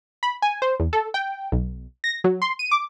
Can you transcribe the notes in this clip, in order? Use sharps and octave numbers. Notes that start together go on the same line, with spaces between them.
B5
G#5
C5
E2
A4
G5
B1
A#6
F#3
C6
D#7
D6